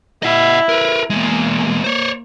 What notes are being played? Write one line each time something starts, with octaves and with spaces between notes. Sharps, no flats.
E4 D#5 F#5
A#4 B4
E2 G#3 A#3
C5 C#5